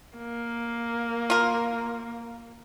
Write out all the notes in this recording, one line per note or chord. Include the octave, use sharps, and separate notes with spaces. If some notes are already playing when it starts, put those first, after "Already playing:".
A#3
F4 A#4